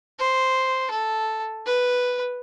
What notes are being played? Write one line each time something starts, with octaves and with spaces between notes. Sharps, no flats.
C5
A4
B4